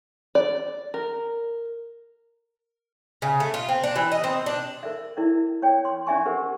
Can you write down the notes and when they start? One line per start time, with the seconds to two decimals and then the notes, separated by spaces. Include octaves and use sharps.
0.35 D5
0.94 A#4
3.22 C#3
3.40 A3
3.54 F4
3.69 C4
3.84 D4
3.96 E3
4.12 D#5
4.24 C4
4.46 D4
4.83 A#4 E5
5.17 E4 A#4 D5 E5
5.62 C#5 D5 G5
5.85 C6
6.07 C#4 D5 E5 G#5 C#6
6.25 G4 A#4 B4 F#5